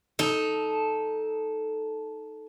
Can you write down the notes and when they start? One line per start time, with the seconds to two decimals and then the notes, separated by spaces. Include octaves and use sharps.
0.19 D#4 A4